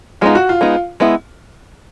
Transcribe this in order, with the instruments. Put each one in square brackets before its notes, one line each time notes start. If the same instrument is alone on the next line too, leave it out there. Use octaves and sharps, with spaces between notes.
[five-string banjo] G#3 B3 D#4 [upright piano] F4
[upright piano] F#4
F4
[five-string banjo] G#3 B3 D#4
G#3 B3 E4